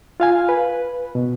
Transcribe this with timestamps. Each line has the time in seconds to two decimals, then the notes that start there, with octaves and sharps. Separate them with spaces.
0.20 F4 F5 G#5
0.49 B4
1.15 B2